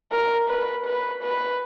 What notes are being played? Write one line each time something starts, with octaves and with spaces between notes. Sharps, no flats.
A#4
B4
B4
B4